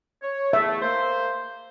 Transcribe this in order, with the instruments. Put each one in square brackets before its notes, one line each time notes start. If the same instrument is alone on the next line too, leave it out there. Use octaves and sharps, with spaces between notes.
[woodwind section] C#5
[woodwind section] E2 A3 [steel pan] E5
[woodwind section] A#3 C5